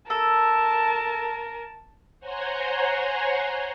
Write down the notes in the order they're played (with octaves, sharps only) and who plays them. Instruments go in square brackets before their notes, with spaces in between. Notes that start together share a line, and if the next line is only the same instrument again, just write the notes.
[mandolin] A4 [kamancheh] A#4 [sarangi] A5
[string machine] C5 C#5 F#5 G#5 A#5 C6